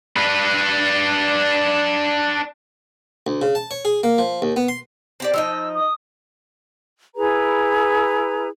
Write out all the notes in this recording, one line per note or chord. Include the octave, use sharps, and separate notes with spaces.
D4 B4
D2
C#3
A5
C#5
G#4
A#3
F3
D#2
B3
C6
C4 G4 D5
F3 D#4 D#5 E6
D#6
E4 G#4 B4 A#5